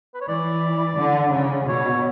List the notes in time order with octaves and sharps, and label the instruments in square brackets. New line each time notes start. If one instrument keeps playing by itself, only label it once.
[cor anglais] B4
C#5
[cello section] E3 [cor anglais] D5
[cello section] D3
C#3
[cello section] B2 [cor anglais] C#5